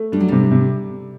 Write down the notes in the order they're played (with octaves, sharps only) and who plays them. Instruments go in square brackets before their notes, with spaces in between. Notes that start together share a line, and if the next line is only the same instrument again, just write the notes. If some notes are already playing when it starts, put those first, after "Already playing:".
Already playing: [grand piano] A3
[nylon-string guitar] G3 [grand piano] D4
[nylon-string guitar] F#3
[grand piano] C3 [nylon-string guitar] G3
[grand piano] C3